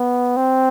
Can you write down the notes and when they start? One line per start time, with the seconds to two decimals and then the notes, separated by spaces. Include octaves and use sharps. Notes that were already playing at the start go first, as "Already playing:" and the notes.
Already playing: B3
0.37 C4